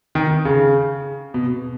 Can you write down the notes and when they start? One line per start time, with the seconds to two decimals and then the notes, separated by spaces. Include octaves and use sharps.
0.15 D#3
0.45 C#3
1.34 B2